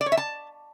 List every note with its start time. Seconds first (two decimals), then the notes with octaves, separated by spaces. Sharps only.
0.01 D5
0.06 C#5
0.12 E5
0.17 A5